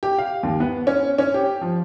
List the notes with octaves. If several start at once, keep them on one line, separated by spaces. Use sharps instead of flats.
G4
F5
D#2
B3
C#4
C#4
G4
F3